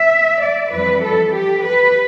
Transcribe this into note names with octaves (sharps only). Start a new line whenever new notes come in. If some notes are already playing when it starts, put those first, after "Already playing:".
Already playing: E5
D5
F2 E3 G3 B4
A4
G4
B4